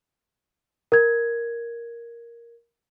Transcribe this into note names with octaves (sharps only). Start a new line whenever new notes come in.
A#4 G#6